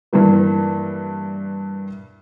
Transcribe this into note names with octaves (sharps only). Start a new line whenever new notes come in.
G2 E3 G3 A#3